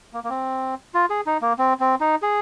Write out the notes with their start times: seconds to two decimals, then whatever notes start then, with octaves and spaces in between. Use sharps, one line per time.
0.13 A#3
0.24 A#3
0.30 C4
0.94 F4
1.10 G#4
1.26 D#4
1.42 A#3
1.59 C4
1.80 C4
2.01 D#4
2.22 G#4